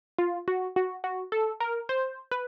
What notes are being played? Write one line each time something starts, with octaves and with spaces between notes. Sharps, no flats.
F4
F#4
F#4
F#4
A4
A#4
C5
B4